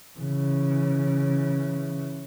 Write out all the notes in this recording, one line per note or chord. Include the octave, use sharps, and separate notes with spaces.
C#3 E3